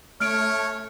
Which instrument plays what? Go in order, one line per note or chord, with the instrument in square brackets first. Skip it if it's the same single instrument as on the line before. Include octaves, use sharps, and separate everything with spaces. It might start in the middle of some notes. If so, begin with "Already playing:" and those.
[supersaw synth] A3 [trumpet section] C#4 C#5 [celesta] F6 D7